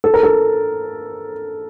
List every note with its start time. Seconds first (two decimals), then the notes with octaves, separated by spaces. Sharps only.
0.04 A4
0.14 A#4
0.23 A4